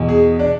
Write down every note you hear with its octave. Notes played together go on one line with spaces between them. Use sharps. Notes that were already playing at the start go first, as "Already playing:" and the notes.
Already playing: E2 B2
G#4
D4